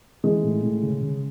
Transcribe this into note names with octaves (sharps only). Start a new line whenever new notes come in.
E3 G#3
A2
A2
C#3
C#3